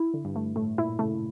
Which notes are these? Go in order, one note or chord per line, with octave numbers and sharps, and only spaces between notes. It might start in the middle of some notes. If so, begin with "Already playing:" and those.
Already playing: E4
D3
G2
A3
A2 A3
A#2 E4
C#3 A3